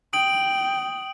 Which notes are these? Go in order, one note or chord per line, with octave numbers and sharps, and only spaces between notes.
G5 D#6 D7 F#7